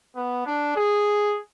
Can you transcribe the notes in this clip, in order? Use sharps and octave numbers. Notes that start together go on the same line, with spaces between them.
B3
D4
G#4